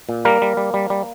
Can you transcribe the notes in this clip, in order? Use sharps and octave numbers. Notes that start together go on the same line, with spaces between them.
A#2
G3 A#3 A#4
G3
G3
G3
G3